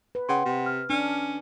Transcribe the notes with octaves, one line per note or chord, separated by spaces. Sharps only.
B4
C#3 F#5 G5 C6
C3
F6
C#4 D4